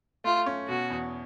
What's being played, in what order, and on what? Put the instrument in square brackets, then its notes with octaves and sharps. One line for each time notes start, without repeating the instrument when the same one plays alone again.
[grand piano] A3 [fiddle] F4
[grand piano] C#4
[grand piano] B2 [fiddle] F#4
[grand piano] E2